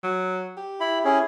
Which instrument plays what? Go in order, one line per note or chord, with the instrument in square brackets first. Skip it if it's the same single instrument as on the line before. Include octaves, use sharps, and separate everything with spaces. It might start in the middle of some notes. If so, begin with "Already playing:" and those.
[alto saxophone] F#3
G4
[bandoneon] E4 B5
C#4 E4 G#4